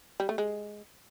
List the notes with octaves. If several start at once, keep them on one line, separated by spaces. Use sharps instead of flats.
G3
A3
G#3